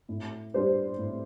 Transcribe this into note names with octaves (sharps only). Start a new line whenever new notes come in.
A2
G3 D4 G4 C5
A2